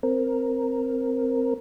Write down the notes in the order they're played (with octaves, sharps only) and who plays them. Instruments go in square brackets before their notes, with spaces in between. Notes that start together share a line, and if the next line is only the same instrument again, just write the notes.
[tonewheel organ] C4 A#4